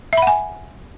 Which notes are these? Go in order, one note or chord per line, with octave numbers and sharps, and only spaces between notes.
E5 F#5 G#5 B5